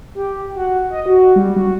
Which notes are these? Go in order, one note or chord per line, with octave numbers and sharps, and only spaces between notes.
G4
F#4
D#5
F#4
G3
F#4